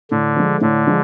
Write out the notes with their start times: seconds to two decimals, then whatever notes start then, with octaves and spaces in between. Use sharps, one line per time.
0.11 A2 D3
0.36 F3 G#3
0.61 A2 D3
0.87 F3 G#3